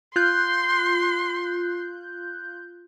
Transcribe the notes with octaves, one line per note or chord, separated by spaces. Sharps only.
F4 C6 F#6 G6